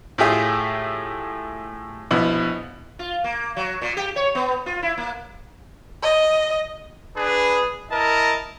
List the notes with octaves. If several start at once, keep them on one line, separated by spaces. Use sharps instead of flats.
A2 A3 F4 G4 G#4 E5
A#1 B2 E4
F4
A#3
F#3
A#2
G4
C#5
B3
F4
E4
A#3
D#5
D4 G#4 B4
E4 A#4 D#5 A5